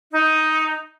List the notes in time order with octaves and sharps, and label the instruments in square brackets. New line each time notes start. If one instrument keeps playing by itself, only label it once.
[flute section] D#4